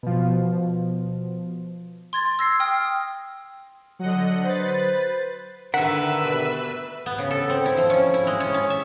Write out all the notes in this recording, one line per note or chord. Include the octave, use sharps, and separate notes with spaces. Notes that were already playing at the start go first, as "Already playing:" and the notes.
B2 F3
C6 G#6 A6
E6 A#6 C7
G5 D#6 F6
D3 F#3 D#5 F#5
B4 C5 A6
D3 D#3 D4 A#4 B4 E5 F#5 B6
B2 G4 A4
B3
C#3
A4
C4
E4
F3
C#4
E4
G#3
C#4
C#4
E5